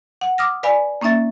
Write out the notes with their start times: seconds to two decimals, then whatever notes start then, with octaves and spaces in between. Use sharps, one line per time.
0.21 F#5
0.38 D6 D#6 F6 A#6
0.63 B4 D5 F5 G#5 B5
1.01 A#3 C#4 D#4 E5 A6